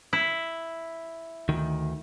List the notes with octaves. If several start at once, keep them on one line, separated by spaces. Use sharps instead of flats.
E4
D2 D#3